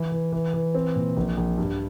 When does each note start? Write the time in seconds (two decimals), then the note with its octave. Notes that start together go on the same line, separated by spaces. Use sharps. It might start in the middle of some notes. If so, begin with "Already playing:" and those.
Already playing: E3
0.12 E3
0.32 E3
0.54 E3
0.75 C4
0.96 A#2
1.17 A#1
1.37 A#1
1.58 G2